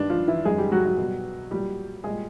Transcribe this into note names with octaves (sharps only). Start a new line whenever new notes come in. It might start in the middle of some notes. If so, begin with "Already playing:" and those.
Already playing: G2 D#3 G3 D4
F3 F4
E3 E4
F#2 D#3 F#3 G#3 G#4
G3 G4
F#3 F#4
F#3 F#4
B2 G3
A#2 F#3 G3 G4
A#2 G3 G#3 G#4